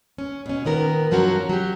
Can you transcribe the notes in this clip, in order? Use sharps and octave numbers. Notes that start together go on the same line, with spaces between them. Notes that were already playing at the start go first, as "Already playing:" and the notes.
C#4
B2 C#4
A#2 D#3 B3 A#4
G2 F3 F#3 C#4 F#4 A#4
F#3 G4